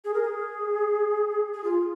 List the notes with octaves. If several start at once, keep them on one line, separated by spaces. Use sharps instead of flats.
G#4
A#4
G#4
G#4
F4